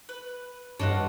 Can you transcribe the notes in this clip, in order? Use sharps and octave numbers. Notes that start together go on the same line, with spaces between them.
B4
G2 D4 F4 C#5 D#5 F#5